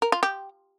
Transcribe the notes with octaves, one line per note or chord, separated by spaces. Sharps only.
A#4
F4
G4